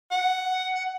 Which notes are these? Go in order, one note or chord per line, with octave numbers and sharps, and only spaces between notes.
F#5
F#5